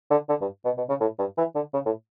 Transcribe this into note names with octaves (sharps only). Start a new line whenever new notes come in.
D3
D3
G2
B2
B2
C#3
A2
G2
E3
D3
C#3
A2